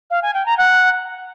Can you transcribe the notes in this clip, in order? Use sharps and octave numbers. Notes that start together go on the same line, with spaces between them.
F5
G#5
G5
A#5
F#5